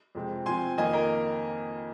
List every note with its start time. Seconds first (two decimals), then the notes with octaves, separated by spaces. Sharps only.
0.15 F2 C3 G#3 C4
0.46 C3 F3 C4 G#5 C6
0.78 F2 D#3 A#3 D#5 G#5
0.93 A#4 D#5